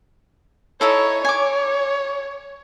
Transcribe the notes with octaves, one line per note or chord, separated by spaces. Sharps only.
D#4 E4 A4 C#5
C#5 G#5 D6